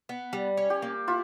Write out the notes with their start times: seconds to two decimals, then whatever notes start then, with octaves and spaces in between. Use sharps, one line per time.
0.09 B3
0.33 G3
0.57 C#4
0.70 G4
0.82 A#3
1.08 E4 F4